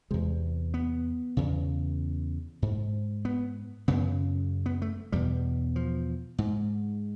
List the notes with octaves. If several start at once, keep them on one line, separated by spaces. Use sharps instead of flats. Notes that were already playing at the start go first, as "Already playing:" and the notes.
E2 C3 G#3
B3
E2 C#3
G#2
B3
F#2 C#3 B3
B3
A3
E2 B2 G3
F3
G#2